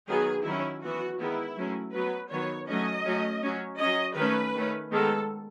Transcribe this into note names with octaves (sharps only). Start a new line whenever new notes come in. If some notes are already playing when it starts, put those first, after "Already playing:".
D#3 F#3 B3 G#4
D#3 F#3 C#4 E4
E3 B3 F#4
D#3 G#3 B3 E4
F#3 A3 C#4
F#3 B3 B4
D#3 F#3 B3 C#5
F#3 A3 C#4 D#5
F#3 A3 C#4
F#3 C#4
F#3 C#4 D#5
D#3 A3 C#4 B4
D#3 A3 C#4
D#3 G#3 B3 A4